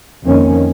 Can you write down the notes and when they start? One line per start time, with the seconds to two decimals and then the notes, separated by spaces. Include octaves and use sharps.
0.25 F2 D#3 A#3 C#4